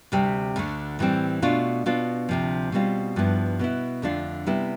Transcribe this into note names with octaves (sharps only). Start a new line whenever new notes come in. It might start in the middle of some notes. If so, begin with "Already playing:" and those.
D2 C3 G3 C4
D2 D3 A3
A2 E3 G3 C4
B2 A3 D4 F4
B2 B3 D4 F4
D2 C3 F3
B2 G3 C4 F4
G2 F3 B3 E4
B2 B3 E4
F2 D3 A3 D4 F4
C3 G3 B3 E4